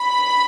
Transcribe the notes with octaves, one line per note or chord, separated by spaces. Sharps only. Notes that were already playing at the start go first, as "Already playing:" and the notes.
Already playing: B5